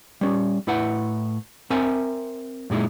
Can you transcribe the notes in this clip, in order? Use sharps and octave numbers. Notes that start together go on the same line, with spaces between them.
G3 C#4
A2 E4 B4 F#5
C4 A#4 E5 G#5
F#2 A#2 G#3 D#4 E4